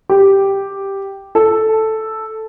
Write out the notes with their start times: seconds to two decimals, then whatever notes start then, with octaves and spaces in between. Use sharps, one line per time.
0.09 G4
1.35 A4